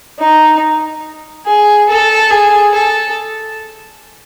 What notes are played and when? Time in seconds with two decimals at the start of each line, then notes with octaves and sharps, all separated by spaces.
0.19 D#4
1.46 G#4
1.89 A4
2.31 G#4
2.74 A4